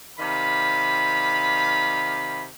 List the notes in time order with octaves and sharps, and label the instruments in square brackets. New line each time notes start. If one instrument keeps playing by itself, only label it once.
[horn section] C3 D#3 D5 F5 B5